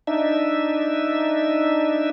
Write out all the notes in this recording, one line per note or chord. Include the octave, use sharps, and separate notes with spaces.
D4 D#4 E5